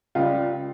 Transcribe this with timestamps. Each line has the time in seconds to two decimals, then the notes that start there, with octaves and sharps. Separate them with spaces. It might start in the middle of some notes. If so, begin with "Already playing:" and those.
0.15 C#2 C#3 G3 F4